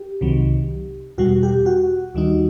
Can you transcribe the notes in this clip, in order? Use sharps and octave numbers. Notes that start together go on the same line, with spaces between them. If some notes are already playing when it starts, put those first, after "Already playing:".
Already playing: G4
C2 C3 D#3 F#3
E2 B2 G3 F#4
G4
F#4
D#2 D#3 G3 D#4